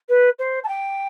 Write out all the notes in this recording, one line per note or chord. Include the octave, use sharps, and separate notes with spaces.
B4
C5
A5
G5